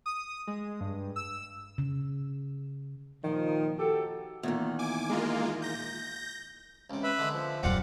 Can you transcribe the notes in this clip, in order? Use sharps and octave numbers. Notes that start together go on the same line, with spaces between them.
D#6
G#3
G2
E6
C#3
A#2 D#3 F3
F#4 G4 A4
E2 A#2 D#3
G#5 D6
G#3 A#3 F4
G6 A#6
C#2 C3
B4 E5 B5
D3 G#3
F3
D#1 F#2 C4 D4 F4 F#5